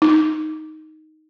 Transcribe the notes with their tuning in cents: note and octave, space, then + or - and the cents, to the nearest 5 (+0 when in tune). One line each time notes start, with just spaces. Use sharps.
D#4 +5